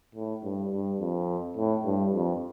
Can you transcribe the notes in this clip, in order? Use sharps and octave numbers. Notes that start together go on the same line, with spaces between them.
A2
G2
G2
F2
A2
G2
F2